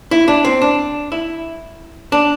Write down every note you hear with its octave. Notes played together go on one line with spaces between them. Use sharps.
E4
D4
C4
D4
E4
D4